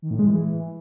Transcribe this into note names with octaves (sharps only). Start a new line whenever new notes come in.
D#3
A2
G#3
E3